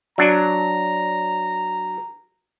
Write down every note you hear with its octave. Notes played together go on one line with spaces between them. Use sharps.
F#3 D4 A#5